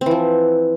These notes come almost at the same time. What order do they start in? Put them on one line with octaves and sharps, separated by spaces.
C4 E3 F3